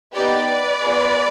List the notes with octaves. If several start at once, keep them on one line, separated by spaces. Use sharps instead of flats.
B3 D#4 G4 B4 D5
B3 F4 G#4